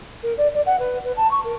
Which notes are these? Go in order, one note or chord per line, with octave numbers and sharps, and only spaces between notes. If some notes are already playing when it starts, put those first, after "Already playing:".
A#4
D5
D5
F#5
B4
B4
A5
C#6
A#4